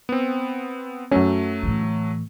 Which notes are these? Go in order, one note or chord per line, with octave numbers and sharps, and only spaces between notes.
B3 C4
F#2 F#3 A3 C#4
A2 E3